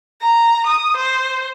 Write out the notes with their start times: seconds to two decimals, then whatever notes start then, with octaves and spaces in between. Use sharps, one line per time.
0.22 A#5
0.67 D#6
0.97 C5